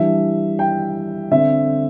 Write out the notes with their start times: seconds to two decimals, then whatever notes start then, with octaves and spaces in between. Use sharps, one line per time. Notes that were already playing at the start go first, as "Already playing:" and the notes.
Already playing: E3 G3 D4 E5
0.59 G5
1.31 D3 C4 E5